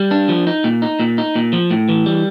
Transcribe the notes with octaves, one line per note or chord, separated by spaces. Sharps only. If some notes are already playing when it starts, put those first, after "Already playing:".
Already playing: G3
D4
F3
D#4
A#2
D#4
A#2
D#4
A#2
F3
A2
E3
G3